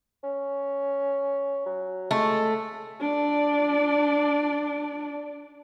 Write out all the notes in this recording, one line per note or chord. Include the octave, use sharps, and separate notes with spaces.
C#4
F#3
G#3 A3
D4 D5